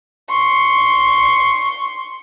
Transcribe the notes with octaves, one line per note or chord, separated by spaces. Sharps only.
C6 C#6